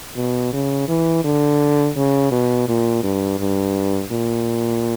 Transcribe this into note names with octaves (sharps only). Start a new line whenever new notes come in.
B2
C#3
E3
D3
C#3
B2
A#2
G2
G2
A#2